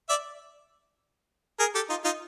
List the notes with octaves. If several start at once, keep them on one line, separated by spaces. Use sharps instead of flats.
D5 E5
G#4 A#4
G4 A4
D#4 F4
D#4 F4